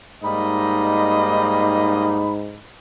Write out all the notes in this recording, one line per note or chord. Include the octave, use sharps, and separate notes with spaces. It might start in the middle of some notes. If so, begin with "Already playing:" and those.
G#2 G3 A#3 D#4 D#5 B5